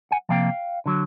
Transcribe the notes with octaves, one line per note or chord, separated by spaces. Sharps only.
F#5 G#5
C3 F3 A#3 F5 G5
D3 F#3